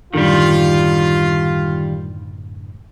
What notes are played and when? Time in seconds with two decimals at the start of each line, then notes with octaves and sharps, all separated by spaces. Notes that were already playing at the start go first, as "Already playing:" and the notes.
0.14 F#2 A2 D3 D#3 G3 F4